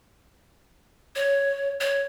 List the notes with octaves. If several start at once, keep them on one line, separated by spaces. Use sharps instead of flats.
C#5
C#5